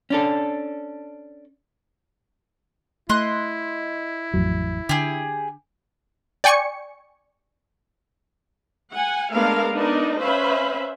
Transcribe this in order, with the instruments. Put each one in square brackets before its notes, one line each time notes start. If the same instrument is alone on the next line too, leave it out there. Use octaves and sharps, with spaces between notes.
[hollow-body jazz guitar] C#4 D4 A4
[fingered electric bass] A3 [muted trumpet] E4 [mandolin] D#5 C6 F#6
[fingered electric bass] A1 F2 F#3
[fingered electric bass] D3 [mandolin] G4 G#4
[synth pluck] D5 G5 G#5 C#6 C#7
[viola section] F#5 G#5
G#3 A3 B3 D4 A#4 F5
B3 D4 D#4 A#4 D#5
C#4 B4 C5 E5 F5 B5